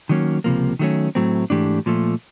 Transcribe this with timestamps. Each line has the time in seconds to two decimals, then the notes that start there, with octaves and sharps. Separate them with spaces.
0.09 D#3 F#3 A#3 C#4
0.44 C#2 C3 F3 A#3
0.79 D#3 F#3 A3 C#4
1.15 A2 F#3 A3 C4
1.50 G#2 E3 A3 D4 G4
1.86 A#2 F3 A3